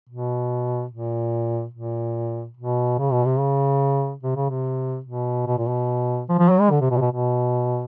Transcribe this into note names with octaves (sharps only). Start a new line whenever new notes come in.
B2
A#2
A#2
B2
C#3
B2
C3
C#3
C3
C#3
C3
B2
B2
A#2
B2
F3
F3
F#3
G#3
D3
C3
B2
C3
B2
B2